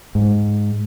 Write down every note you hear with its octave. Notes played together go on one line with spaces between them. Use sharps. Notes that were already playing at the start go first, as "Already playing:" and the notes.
G#2